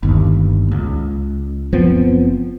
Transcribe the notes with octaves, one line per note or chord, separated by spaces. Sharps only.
G1 D#2
C#2
F#1 F3 B3 C4